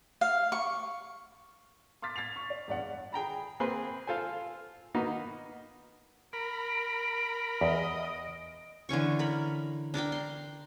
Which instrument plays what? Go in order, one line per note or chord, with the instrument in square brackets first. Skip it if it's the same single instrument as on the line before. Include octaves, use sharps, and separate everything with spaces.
[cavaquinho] F5
C#6
[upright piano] C6 D6 F6 A6 B6
G#6 A6 B6 C7 F7
C#6
D5
E2 G2 D5 F#5
[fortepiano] G#4 G5 A#5 B5
A#3 C4 G#4 B4 C6
F4 A4 C5 G#5
A#3 B3 D#4 F#4
[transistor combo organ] A#4 B5 [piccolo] D7
[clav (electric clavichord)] E2 [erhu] D#5
[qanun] D3 E3 C#4 C#6
A#4 B5
D4 A#4 D5 G5
C6